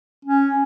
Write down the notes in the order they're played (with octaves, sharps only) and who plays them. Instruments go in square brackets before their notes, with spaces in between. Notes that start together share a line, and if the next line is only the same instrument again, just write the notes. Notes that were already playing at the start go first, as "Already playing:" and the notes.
[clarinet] C#4